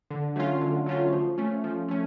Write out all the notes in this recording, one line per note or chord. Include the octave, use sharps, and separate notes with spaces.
D3
F#3 A3 C#4 F4
D3
F#3 A3 C#4 F4
F3
A3 C#4
F3
A3 C#4